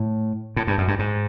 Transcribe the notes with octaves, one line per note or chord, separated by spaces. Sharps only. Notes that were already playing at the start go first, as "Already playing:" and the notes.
Already playing: A2
A2
G2
F#2
G2
G#2